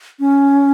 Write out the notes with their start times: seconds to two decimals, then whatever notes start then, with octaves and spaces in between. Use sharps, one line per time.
0.19 C#4